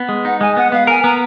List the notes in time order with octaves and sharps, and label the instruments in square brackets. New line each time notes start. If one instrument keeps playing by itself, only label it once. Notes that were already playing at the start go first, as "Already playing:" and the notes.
Already playing: [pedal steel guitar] B3
G#3
[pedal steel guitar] D#4 [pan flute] F#5
[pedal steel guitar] G#3 [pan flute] G#5
[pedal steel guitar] B3 [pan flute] F#5
[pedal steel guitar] B3 [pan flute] F5
[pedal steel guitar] A#4 [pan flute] G#5
[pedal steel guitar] B3 [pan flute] A#5